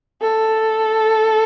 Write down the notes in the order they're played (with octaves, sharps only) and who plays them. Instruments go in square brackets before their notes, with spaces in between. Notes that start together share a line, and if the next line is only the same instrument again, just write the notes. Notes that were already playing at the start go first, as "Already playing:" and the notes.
[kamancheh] A4